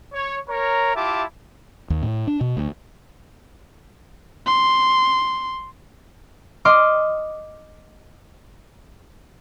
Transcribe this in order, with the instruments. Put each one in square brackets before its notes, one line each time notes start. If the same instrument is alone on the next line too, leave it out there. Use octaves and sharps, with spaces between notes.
[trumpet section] C#5
A#4 C#5 A#5
E4 F4 G4 E5 A5 D6
[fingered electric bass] D#2
A2
D4
B2
D2
[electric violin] C6
[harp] D#5 C6 D6 F6